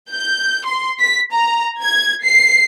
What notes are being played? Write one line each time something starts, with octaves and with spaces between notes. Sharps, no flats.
G6
C6
B6
A#5
G#6
C7